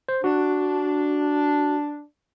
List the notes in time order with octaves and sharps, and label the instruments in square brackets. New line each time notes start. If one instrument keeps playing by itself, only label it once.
[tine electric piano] C5
[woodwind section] D4 [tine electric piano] F#4